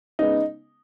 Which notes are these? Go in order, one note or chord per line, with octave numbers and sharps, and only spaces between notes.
C#3 G#3 B3 D#4